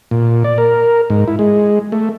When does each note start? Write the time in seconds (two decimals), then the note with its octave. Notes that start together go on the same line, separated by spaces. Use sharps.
0.11 A#2
0.44 D5
0.58 A#4
1.10 G#2
1.28 E4
1.39 G#3
1.92 A3